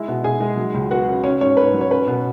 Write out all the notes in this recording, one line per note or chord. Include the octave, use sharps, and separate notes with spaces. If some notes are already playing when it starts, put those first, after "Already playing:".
Already playing: G#3 E4
B2
B2 G#4 G#5
G#3
F#3
C#2
B3 F#4 F#5
C#3
C#4 C#5
G#2 C#4 C#5
G#2 B4
F#3
C#5
C#4 B4
B2